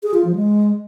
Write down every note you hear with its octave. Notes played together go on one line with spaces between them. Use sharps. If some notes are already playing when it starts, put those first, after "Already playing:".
G#4
F4
F3
G#3